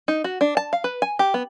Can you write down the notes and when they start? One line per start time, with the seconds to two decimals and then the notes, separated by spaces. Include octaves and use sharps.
0.08 D#4
0.24 F#4
0.41 D4
0.57 A5
0.73 F5
0.84 B4
1.02 G#5
1.19 G4
1.34 B3